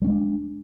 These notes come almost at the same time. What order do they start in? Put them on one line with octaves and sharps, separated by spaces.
G3 C#4 G#3 D4